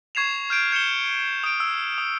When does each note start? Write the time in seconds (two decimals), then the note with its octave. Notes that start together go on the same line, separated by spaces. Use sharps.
0.15 C#6 G#6 C7 E7 F7
0.50 F6 G6 D7
0.72 G6 C#7 E7 G7
1.44 D#6 D7
1.60 E6
1.98 D#6